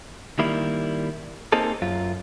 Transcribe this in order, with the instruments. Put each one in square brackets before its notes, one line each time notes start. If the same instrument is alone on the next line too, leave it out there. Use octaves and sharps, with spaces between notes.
[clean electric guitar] D#3 G3 A#3 E4
A#3 C4 D#4 G#4 A4
F#2 F4